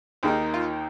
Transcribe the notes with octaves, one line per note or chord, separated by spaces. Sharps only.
D#2 D#3 A#3 D#4 G#4
F4